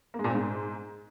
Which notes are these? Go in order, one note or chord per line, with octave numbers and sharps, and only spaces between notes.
A#3
G#3
A#2
C4
G#2